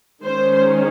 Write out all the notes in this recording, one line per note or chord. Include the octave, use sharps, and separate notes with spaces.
D#3 G#3 C#4 C5